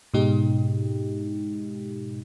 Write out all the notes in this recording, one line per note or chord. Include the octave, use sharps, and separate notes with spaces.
G#2 B2 G#3 D#4 G4